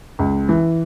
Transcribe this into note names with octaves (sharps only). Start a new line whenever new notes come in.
C#2
E3